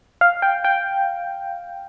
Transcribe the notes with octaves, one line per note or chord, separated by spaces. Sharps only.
F5
G5
G5